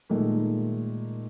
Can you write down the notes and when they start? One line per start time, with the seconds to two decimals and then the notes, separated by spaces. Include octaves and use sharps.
0.09 A#2 D#3 G#3 A3